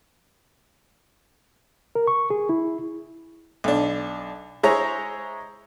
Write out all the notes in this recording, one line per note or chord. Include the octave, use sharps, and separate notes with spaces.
A#4
C#6
G#4
E4
B1 D4
G#3 E4 G#4 C5 C#5 A#5